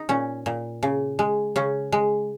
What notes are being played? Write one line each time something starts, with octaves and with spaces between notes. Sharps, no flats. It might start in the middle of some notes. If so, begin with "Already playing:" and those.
Already playing: D#4
A#2 C#4
A#2
C#3
G#3
C#3 C#4
G#3